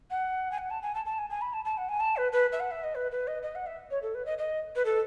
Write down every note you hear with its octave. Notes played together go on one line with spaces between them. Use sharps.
F#5
G#5
F#5
A5
G#5
A5
A5
G#5
G#5
B5
A5
A5
F#5
G#5
A5
B4
B4
E5
F#5
E5
D#5
B4
B4
D#5
D#5
F#5
E5
C#5
A4
B4
D#5
D#5
B4
A4